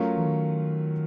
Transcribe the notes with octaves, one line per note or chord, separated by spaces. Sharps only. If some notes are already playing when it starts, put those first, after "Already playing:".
Already playing: F#3 A3 C#4 F4 A#4
E3
D#3